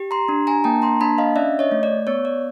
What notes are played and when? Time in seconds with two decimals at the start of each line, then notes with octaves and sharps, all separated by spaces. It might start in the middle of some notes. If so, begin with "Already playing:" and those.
Already playing: G4
0.11 A#5 C6
0.29 D4
0.47 G#5 A#5
0.64 A#3 G5 A5
0.82 A#5 C6
1.01 D4 A5 B5
1.18 D#5 F5
1.36 C#4 D5 E5
1.59 C#5 D#5
1.72 A3
1.83 D5
2.07 B3 C#5
2.25 D5